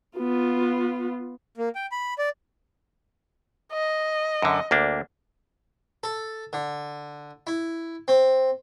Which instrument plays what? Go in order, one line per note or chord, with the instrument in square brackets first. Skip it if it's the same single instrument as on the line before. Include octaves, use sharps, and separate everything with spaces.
[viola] B3 F4
[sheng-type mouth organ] A#3
G5
B5
D5
[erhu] D#5
[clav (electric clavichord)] F#2 D3
D2 A#3 D4
[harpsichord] A4
D3
E4
C4